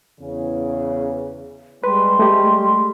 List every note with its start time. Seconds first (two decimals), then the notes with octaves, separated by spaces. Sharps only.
0.19 E2 C#3
1.84 G3 G#3 B4 C6
2.19 A3 G4